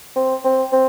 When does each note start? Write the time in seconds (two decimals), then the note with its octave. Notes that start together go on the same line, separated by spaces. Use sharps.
0.16 C4
0.44 C4
0.72 C4